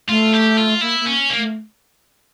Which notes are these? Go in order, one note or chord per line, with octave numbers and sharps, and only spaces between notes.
A3 F4
G4
F4
A#3 E4
A#3
C#4
A#3
A3